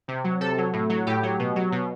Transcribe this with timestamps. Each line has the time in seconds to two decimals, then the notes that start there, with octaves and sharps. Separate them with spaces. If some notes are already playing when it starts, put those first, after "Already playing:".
0.08 C3
0.24 F#3
0.40 C3 A4
0.58 F#3
0.73 A2
0.89 F#3
1.07 A2 G4
1.23 F#3
1.39 B2
1.56 F#3
1.72 B2